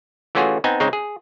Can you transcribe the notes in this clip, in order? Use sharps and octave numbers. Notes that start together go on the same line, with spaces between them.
E3 A3 C#4 F4 F#4 G#4
B3 C4 D#4 G#5
C#3 G#3 C4 D#4
G#4